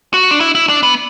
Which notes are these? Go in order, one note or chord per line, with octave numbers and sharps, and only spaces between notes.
F#4
D4
E4
E4
D4
B3